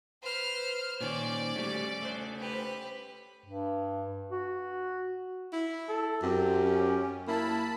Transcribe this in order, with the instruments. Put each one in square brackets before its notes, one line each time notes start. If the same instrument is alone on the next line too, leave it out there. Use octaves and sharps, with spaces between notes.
[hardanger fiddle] B4 [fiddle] C5 F6
[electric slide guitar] A#2 D#3 [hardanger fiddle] C#4 C5 [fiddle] D5
[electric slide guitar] G3 A3 [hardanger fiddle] C#4
[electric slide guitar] A3 C5
[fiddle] G4 B4
[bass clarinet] G2
F#4
[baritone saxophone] E4
[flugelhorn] A4
[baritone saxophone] F#2 [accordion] C4 [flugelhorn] G4
[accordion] C#4
[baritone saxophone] A#3 [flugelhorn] E4 [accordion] A5 B5